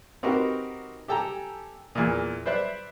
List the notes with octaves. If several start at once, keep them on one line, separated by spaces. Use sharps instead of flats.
C4 D#4 F#4 G4 A#4 B4
G4 A4 G5 G#5 A#5
E2 A#2
B4 C5 D5 E5 F#6